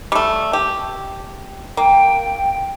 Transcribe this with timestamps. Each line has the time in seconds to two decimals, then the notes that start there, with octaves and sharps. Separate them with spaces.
0.12 G3 A3
0.53 G4
1.77 A#3 G5